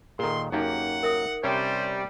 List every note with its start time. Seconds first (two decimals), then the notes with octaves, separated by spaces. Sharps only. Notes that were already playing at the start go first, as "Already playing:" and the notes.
0.19 A#2 D#3 G#4 A4 C6
0.52 F#2 A#3 D#4 G4 F#5
1.03 A#4 E5 D#6
1.43 C3 G3 C#4 C5 C#5